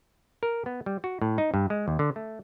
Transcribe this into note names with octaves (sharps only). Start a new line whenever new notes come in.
A#4
B3
G3
F#4
A2
D#4
G2
G#3
D#2
D3
A3